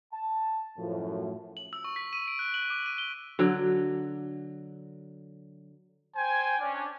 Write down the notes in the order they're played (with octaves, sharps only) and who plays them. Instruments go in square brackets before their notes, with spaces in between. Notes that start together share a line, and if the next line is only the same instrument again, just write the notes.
[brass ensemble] A5
F#2 A2 F3
[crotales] F#7
E6
C#6
B6
D#7
D7
F#6
F#7
D6
D#7
G7
[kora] D3 F#3
[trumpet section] C5 G5 G#5
C#4 D4